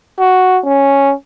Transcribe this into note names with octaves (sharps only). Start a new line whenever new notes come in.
F#4
C#4